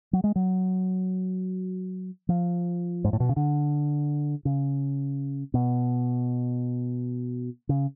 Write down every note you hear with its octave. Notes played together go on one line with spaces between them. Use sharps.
F#3
G#3
F#3
F3
G#2
A2
B2
C#3
D3
C#3
B2
C#3